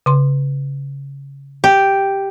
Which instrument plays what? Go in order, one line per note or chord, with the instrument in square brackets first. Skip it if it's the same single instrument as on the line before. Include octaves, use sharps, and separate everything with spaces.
[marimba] C#3 C6
[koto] G4